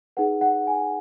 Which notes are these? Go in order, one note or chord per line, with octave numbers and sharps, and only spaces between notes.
D#4 G#4 B4 F#5
F#5
G#5